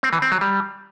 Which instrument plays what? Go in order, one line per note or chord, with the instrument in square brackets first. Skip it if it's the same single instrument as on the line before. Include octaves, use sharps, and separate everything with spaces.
[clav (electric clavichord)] C4
E3
C4
F#3
G3